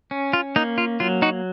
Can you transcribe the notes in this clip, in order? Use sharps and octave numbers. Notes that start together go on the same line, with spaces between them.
C#4
F4
A#3 D#4
F4
F#3 F4
D#4 F#4